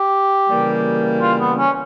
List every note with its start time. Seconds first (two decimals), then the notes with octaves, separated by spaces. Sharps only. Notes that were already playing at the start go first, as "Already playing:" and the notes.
Already playing: G4
0.49 C#3 E3 G3 A#3
1.21 F4
1.40 B3
1.58 C#4